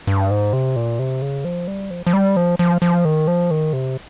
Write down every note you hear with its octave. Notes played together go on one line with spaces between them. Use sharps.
G2
G#2
C3
A#2
C3
C#3
F3
G3
F3
F3
G3
F3
F3
F3
D#3
F3
D#3
C3